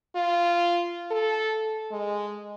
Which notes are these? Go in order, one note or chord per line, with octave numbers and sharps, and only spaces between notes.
F4
A4
G#3